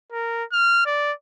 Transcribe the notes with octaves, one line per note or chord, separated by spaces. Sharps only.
A#4
F6
D5